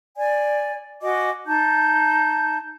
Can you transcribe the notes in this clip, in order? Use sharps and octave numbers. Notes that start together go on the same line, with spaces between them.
D5 G#5
F#4 D#5 G#5 D6
D#4 A5 G6